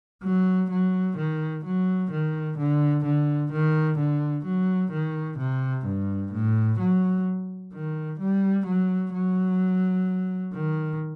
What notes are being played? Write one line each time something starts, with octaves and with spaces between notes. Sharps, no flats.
F#3
F#3
D#3
F#3
D#3
D3
D3
D#3
D3
F#3
D#3
C3
G2
A2
F#3
D#3
G3
F#3
F#3
D#3